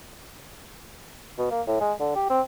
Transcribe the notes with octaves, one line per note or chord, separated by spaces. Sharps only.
B2
A#3
A2
G#3
D3
G4
C4